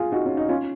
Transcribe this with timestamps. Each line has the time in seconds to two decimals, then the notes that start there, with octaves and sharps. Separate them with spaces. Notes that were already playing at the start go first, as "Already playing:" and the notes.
Already playing: F4 G#4
0.12 D#4 F#4
0.25 C#4
0.37 D#4
0.49 C#4 F4